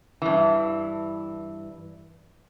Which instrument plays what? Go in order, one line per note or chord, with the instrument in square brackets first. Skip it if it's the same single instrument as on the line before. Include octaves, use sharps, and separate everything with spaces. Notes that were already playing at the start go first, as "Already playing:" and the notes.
[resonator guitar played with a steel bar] G2 E3